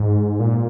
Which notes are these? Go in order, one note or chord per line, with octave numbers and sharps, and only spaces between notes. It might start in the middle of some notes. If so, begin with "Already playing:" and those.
Already playing: G#2
A#2